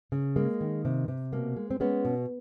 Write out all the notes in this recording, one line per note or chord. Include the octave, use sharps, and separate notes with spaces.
C#3
G#3 A#3
D#3
C3
C3
B2 A#3
G#3
C4
G#3 B3 C#4
B2